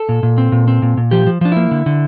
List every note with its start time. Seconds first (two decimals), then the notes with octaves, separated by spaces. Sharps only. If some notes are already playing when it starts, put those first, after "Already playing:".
Already playing: A4
0.09 A#2
0.23 A#2
0.38 C4
0.52 A#2
0.68 C4
0.82 A#2
0.97 A#2
1.11 F3 G4
1.27 F3
1.41 F3 D4
1.52 A#3 E4
1.71 D3
1.86 D3